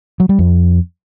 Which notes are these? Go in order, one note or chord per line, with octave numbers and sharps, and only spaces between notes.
F#3
G3
F2